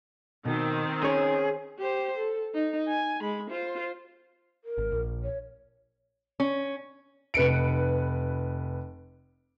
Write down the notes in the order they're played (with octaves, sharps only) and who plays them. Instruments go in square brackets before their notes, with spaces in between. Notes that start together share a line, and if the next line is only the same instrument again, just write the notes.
[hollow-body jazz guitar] B2 [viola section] D#3 C4
[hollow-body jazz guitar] C#4 C#5 [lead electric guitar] G#4
[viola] G4 C5
A4
D#4
G#5
G#3 B5
F4 C5
[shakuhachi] A#4
[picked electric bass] G#1
A#1
[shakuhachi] C#5
[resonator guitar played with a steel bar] C#4
[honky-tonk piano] F1 B4 C#7 D7